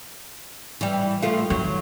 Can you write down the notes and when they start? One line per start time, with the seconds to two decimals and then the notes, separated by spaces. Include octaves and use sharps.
0.81 E3 G3
1.22 F3 A3 F4
1.50 D#3 F#3